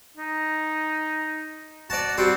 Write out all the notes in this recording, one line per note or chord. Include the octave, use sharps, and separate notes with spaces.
D#4
F#4 D5 A5
G3 C4 F#4